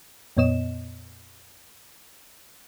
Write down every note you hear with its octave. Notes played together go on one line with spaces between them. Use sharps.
F2 A#2 B3 C#5 D#5 E7